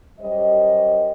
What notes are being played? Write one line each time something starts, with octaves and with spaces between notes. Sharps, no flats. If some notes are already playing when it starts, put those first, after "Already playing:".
F#2 G3 C5 D#5